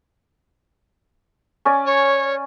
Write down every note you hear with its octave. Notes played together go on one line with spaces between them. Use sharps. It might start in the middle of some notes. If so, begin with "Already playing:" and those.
C#4 D5 G#5
C#5